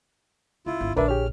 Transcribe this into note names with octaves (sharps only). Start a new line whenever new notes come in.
C#2 E4 F4
G1
A#1 D3 D4 A#4 B4 D5 E5
G4 G#4 C#5 F6